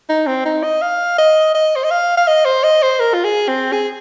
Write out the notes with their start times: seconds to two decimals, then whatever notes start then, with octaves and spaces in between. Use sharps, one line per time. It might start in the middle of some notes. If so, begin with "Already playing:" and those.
0.09 D#4
0.27 C4
0.45 D#4
0.63 D#5
0.82 F5
1.18 D#5
1.54 D#5
1.76 C5
1.84 D#5
1.91 F5
2.17 F5
2.27 D#5
2.45 C5
2.64 D#5
2.83 C5
3.00 A#4
3.14 F4
3.24 G#4
3.48 C4
3.73 G#4